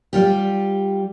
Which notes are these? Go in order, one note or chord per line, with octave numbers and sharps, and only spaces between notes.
G3 F4 G4